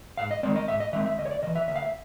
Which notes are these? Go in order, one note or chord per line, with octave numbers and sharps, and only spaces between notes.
G#2 F5
D#5
D#3 G#3 C4 D5
D#5
G#2 E5
D#5
D#3 G#3 C4 E5
E5
D2 D#5
C#5
D5
C#3 D#5
E3
E5
D2 E5
F5
E5